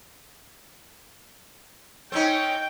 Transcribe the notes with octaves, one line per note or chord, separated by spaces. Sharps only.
C4 C#4 D#4 G5